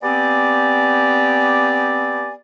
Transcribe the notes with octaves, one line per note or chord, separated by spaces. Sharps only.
B3 C4 G4 D5 G#5